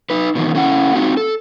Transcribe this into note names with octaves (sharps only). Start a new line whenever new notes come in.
D#4 B4
B2 D#3 E3
A3 C#4 E4 F#5
C4 D#4 F4 F#4
A4